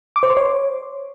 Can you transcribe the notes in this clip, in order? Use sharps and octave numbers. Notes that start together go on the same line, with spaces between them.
D6
C5
C6
C#5